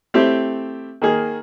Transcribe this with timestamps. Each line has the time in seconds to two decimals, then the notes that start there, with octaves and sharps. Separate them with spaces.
0.14 A3 C4 E4 G4
1.02 D#3 A#3 G#4